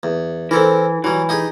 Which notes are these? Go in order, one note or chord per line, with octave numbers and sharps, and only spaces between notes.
E2
E3 C4 A4 A#4
E3 F#3 G3
D#4 G4 G#4